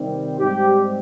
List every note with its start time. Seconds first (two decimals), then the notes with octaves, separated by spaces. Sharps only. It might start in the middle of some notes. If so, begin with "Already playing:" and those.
Already playing: C3 D#3 G3 C4
0.39 G#2 G3 C4 G4